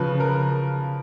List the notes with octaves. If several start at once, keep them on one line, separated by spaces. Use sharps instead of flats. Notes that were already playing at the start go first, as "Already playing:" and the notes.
Already playing: C#3 F3 B4
A#4